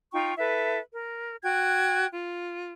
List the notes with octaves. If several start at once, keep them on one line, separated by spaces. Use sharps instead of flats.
D#4 F4 G5 C#6
E4 A4 B4 E5
A#4
F#4 G5 F#6 G#6
F4